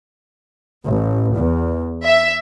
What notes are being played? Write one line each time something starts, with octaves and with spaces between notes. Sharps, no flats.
A1
E2
E5